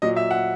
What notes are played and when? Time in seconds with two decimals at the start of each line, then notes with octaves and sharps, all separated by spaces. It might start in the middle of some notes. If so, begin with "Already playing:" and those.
0.02 A#2 F#3 D#5
0.17 E5
0.31 F#5